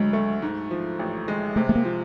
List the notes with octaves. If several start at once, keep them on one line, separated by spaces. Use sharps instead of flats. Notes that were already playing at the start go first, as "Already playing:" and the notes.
Already playing: D2 D3 F#3 G#3
A3
G#2
F3
A1
G#3
C3 A3
A3
A#3
F3